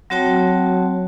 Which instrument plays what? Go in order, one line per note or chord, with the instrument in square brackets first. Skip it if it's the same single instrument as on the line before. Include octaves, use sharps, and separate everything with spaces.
[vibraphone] F#3 C4 F#4 C#5 G5 A5